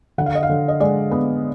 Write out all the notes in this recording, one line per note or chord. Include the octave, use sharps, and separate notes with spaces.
D3 F#5
F5
D#5
F5
D3
D#5
G#3 D5
B3